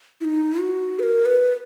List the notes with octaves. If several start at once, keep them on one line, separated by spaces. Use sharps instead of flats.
E4
D#4
F#4
B4
A#4
B4